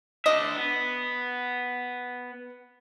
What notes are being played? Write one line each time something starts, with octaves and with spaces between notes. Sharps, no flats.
D4 D#5 E5
B3